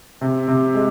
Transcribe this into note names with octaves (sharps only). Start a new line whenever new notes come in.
C3
C3
G#3